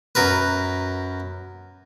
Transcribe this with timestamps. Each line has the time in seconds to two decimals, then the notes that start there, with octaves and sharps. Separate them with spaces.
0.15 F#2 A#4 B4